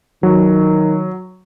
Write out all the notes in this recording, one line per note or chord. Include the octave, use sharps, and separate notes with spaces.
D#3 F#3